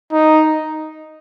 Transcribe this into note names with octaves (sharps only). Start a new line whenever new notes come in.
D#4